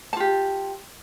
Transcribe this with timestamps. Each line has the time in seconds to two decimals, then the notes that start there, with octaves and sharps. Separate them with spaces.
0.13 A5
0.17 F4
0.20 G4